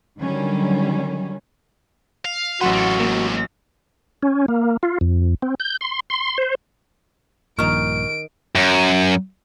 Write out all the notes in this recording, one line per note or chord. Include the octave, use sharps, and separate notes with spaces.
D3 D#3 F#3 G3 C#4
F5
A1 F#3 F#4 A4 B4 F#5 C6
A#3 A4
G#2 C3 A#3
C#4
A#3
F4
F2
C4
G6
C6
C6
C5
A#1 G2 A#2 D#3 D#4 C#6 F6 D7
F#2